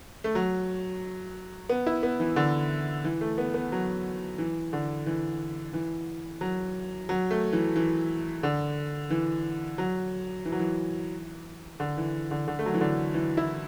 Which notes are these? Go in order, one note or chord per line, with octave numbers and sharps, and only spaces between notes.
A3
F#3
B3
E4
B3
E3
D3
E3
A3
B3
B3
F#3
E3
D3
E3
E3
F#3
F#3
A3
E3
E3
D3
E3
F#3
E3
F#3
E3
D3
E3
D3
D3
A3
F#3
E3
D3
E3
E4